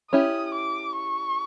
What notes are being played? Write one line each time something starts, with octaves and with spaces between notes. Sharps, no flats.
C#4 E4 G4 D#6
D6
C#6